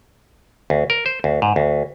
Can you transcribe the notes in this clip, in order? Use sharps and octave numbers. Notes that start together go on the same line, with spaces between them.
D2
A#4
C5
D2
G#2
D2